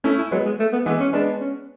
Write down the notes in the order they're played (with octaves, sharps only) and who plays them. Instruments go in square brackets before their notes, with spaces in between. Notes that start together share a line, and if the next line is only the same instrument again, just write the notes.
[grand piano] A3 C#4 [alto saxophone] E4
[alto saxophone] E4
[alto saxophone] F#3 [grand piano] G#3 B3
[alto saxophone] G#3
A3
B3
[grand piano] E3 G#3 [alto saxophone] B3
[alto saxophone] C#4
[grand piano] G#3 B3 [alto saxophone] D4
[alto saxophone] C#4